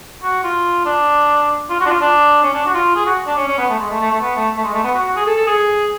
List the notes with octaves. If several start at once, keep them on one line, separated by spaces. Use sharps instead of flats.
F#4
F4
D4
F4
F#4
D4
F4
D4
C#4
D4
F#4
F4
G#4
F#4
D4
C#4
C#4
B3
A3
G#3
A3
A3
A3
B3
A3
A3
G#3
A3
B3
F#4
F#4
G#4
A4
A4
G#4